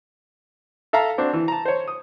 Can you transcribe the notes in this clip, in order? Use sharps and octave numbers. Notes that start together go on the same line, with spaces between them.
A4 E5 F5 A5 A#5
C4 D4 F#4
E3
A5 A#5
C5 C#5
D#6